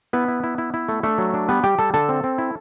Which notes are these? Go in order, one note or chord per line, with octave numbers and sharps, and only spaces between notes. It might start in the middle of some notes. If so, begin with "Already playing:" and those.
B3 E4 B4
E4
E4
E4
E4
A3
A3 D4 A4
F#3
D4
G3 B3 B4
G3 G4 G5
G3 A4 A5
D3 A4 A5
C4
C4
E4